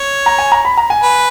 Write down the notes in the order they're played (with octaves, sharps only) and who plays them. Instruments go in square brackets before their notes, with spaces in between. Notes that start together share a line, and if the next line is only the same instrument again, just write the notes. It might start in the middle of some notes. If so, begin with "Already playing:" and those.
Already playing: [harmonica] C#5
[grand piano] A#5
G#5
A#5
B5
A#5
G#5
[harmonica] B4